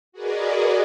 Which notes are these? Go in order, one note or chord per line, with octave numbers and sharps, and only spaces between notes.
F#4 G#4 A#4 B4 D5 D#5